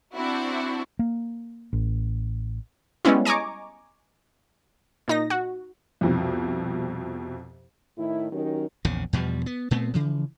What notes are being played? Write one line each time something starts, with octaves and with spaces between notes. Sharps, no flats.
C4 D4 E4 F#4
A#3
A1
G3 G#3 B3 C#4 E4
D#5 G#5 A#5 C#6 D6
A#2 D#4 A#6
F#4
C2 F2 B2
A2 D#3 A3 E4
D#3 F#3 C#4 D#4 G4 A#4
A#1 E2 C#3
E2 B2 F3 G3
B3
A#2 A3 B3 C4
C#3 E3 F3